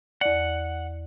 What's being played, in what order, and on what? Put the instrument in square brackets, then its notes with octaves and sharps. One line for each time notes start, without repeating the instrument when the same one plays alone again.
[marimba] E2 D5 [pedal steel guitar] F#5